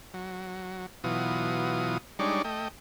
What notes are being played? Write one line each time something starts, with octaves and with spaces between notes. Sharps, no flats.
F#3
B2 E3 F#3 F4 D#6
G3 G#3 D4 D#4 C#5 D5
A3 D#5 G5